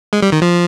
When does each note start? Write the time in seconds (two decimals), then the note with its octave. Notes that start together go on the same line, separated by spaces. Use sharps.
0.13 G#3
0.22 G3
0.32 D#3
0.42 F3